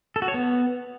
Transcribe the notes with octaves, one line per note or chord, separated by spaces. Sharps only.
A4
F#4
C#5
B3